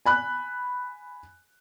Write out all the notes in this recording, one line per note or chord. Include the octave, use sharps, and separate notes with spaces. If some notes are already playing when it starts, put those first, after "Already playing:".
G#5 B5 F#6